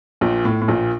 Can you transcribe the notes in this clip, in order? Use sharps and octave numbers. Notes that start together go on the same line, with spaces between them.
A#1 A#2
A2
A2
A#1 A#2